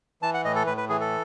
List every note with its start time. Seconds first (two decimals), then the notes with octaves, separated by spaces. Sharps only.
0.22 E3 A5
0.34 F#5
0.45 A2 D#5
0.55 A4
0.66 A2 B4
0.77 B4
0.89 E3 G#4
1.00 A4